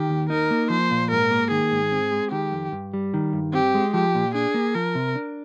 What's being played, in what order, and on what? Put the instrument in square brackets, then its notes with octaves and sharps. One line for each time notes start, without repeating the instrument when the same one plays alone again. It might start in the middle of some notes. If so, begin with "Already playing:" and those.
Already playing: [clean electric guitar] D#3 [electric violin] G4
[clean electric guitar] D#2
[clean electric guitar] D#4 [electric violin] A#4
[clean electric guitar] A#3
[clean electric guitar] F3 [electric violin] C5
[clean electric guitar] A#2
[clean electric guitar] G#2 [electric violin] A#4
[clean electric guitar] A#3
[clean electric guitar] D#3 [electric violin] G#4
[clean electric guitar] G#2
C4
G#3
[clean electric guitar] D#3 [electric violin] G4
[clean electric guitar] F2
G2
G3
D#3
G2
[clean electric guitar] C4 [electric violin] G4
[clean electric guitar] G#3
[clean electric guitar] F3 [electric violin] G4
[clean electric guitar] A#2
[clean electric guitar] D4 [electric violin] G#4
[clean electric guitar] A#3
[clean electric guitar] F3 [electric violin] A#4
[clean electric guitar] C3
D4